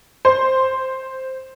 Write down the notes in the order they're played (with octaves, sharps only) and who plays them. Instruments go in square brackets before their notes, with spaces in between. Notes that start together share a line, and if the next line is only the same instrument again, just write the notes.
[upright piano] C5